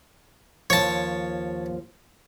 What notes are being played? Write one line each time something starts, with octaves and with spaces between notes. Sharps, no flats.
D#2 F3 C#5 A5